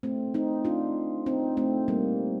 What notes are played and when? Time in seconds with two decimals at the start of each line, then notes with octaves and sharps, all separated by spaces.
0.03 A3 C4
0.34 C4 D#4
0.65 D4 F4
1.26 C4 D#4
1.57 A3 C4
1.88 G3 A#3